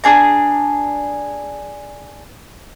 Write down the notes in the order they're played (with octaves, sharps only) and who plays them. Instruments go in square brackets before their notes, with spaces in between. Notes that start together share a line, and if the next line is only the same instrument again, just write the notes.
[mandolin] D4 G#4 A#5